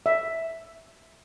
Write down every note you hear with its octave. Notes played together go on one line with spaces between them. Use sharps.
E5